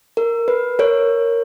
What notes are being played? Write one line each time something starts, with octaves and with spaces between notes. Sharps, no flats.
A#4
B4
A#4 C#5